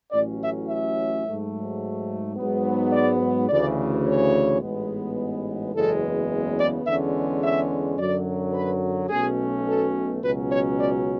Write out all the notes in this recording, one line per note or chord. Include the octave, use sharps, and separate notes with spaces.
A1 A2 F#3 C#4 D5
E5
E5
G#2 F#3 A3
G#2 F#3 B3
D5
D2 C#3 E3 D5
C#5
A1 G#2 G#3 B3
F#1 E2 C#3 G#3 B3 A4
D5
E2 D3 G#3 C#4 E5
E5
F#2 D3 F#3 D5
B4
B1 B2 A3 C#4 G#4
A4
C#2 B2 F#3 C#4 B4
C#5
D5